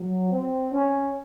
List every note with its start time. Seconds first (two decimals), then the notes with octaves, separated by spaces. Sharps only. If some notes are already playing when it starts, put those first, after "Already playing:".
Already playing: F#3
0.30 C4
0.72 C#4